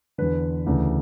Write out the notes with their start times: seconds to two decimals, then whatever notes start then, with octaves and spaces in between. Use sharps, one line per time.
0.18 E2 D3 B4
0.66 D2 C#3 E3